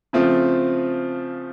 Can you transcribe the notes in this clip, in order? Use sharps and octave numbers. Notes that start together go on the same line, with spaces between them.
C#3 F3 A3 C4 F4